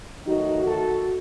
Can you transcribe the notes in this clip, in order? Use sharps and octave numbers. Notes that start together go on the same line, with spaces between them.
D#3 F#3 A3 D#4 F#4
F#4 A4